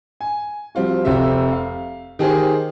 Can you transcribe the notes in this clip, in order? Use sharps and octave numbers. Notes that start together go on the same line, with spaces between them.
G#5
F3 G3 C4 F4 F#4
F1 C3 G4 C5 E5
F5
D#3 G4 G#4 A#4 C5